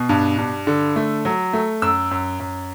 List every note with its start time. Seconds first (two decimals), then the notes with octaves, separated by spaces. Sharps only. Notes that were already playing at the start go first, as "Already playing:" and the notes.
Already playing: B2
0.09 G2
0.38 G2
0.67 D3
0.96 A3
1.25 F#3
1.53 A3
1.82 F#2 E6
2.11 F#2
2.40 F#2